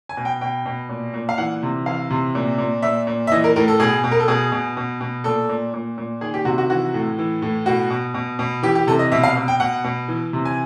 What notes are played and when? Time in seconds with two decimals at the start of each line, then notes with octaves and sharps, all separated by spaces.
0.09 G#5
0.17 B2
0.25 G5
0.41 B2 G5
0.66 B2
0.89 A#2
1.14 A#2
1.29 F5
1.38 E3 F#5
1.62 C3
1.86 E3 F5
2.10 C3
2.35 A#2
2.58 A#2
2.82 A#2 E5
3.07 A#2
3.27 E5
3.32 E3 D#5
3.44 A#4
3.56 A2 A#4
3.68 A4
3.80 B2 G#4
4.04 B2
4.11 A#4
4.20 A4
4.28 B2 G#4
4.52 B2
4.77 B2
5.01 B2
5.24 A#2 A4
5.49 A#2
5.74 A#2
5.98 A#2
6.21 D#3 G#4
6.34 G4
6.45 C3 F#4
6.58 F#4
6.70 E3 F#4
6.94 A2
7.18 E3
7.42 A2
7.66 B2 F#4
7.90 B2
8.14 B2
8.39 B2
8.63 E3 G4
8.75 G4
8.87 C3 A4
8.99 D#5
9.12 B2 E5
9.23 F5
9.36 B2
9.48 G5
9.60 B2 F#5
9.84 B2
10.08 E3
10.33 C3
10.45 G#5